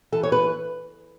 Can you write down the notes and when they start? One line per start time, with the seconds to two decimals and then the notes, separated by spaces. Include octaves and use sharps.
0.12 E3 A4
0.23 C#5
0.32 B4